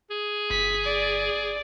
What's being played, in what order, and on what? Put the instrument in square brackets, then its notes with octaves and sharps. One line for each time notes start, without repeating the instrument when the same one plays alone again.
[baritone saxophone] G#4
[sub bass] G1 [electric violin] B6
[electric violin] D5